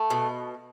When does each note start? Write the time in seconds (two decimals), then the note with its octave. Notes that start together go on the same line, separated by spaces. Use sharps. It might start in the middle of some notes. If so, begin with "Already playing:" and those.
Already playing: A3
0.10 B2